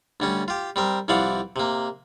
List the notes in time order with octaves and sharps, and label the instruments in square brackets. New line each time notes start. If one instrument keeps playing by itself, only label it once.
[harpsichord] D2 G3 C#4
F4 G4
G3 C4 A#4
C2 E3 F3 D5 F5 F#5
C3 A#3